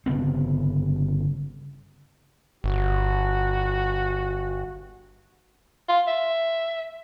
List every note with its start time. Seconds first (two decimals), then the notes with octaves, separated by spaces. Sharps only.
0.06 G1 C#3 B3 C4
2.64 G1 F#4
5.89 F4
6.07 E5